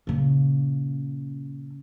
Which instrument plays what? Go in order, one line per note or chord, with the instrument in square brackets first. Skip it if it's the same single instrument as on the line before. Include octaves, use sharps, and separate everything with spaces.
[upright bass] A#2 C#3